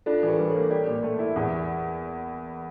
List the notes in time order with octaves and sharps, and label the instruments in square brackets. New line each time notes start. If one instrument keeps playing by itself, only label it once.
[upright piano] D4 [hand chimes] F4 A4
[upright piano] E3
[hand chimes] G4 A#4
[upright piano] G3
[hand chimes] A4 C#5
[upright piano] A#3
[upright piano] G4 [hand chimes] A#4 D5
[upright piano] A#2
A3
E4
E2